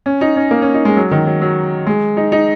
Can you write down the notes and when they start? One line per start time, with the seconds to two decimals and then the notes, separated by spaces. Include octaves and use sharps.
0.06 C#4
0.21 D#4
0.37 C#4
0.51 A#3
0.62 C#4
0.74 D#4
0.85 G#3
0.97 F#3
1.11 D#3
1.27 F#3
1.41 F#3
1.87 G#3
2.17 D#4
2.32 D#4